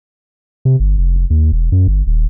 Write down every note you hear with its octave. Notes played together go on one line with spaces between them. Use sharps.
C3
G1
F1
F1
D#2
E1
F#2
G1
D#1